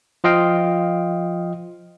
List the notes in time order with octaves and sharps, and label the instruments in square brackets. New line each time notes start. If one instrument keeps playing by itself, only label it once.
[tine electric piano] F3 F4 D#5 F5 G5